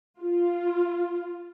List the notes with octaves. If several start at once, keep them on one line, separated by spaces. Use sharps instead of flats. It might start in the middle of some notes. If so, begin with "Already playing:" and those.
F4